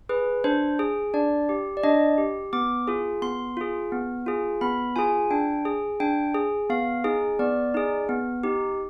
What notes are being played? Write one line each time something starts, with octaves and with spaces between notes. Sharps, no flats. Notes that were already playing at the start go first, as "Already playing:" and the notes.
G#4 B4
D4 C5
G#4
D4 D5
G4
D5
D4 D#5
G4
B3 D6
F4 G#4
B3 C6
F4 G#4
B3
F4 G#4
B3 B5
F4 G#4 G#5
D4 G5
G#4
D4 G5
G#4
B3 F5
D#4 G#4
B3 D5
D#4 G#4
B3
D#4 G4